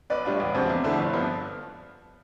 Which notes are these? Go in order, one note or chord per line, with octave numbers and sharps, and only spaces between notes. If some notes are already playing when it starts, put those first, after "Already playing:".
B1 B4 D5
A2 G3 D4 F4
E1
D2 C3 F3 C4
E2
D3 F3 A3 E4
G1
G2 F3 B3 D4